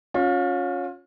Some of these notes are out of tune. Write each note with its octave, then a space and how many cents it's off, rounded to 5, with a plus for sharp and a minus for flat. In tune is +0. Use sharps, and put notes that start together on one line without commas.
C#4 +0 F4 +35